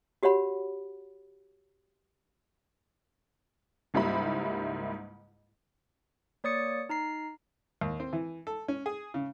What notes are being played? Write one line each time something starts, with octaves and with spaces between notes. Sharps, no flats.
F#4 G4 C#5 F#5 B5
C#2 G#2 G3 A#3 E4 B5
A#3 C#5 D5 D#6 A6 C#7
D#4 A#5 C7
D#2
C4
E3
A4
C#4
G#4
C#3